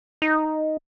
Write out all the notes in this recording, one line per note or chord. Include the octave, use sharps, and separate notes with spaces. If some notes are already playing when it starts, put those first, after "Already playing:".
D#4